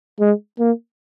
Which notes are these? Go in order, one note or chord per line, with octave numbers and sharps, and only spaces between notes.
G#3
A#3